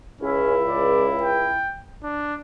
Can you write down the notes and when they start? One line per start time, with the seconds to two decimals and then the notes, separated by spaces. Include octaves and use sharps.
0.21 C#2 C#4 E4
0.65 D5
1.21 G5
2.04 D4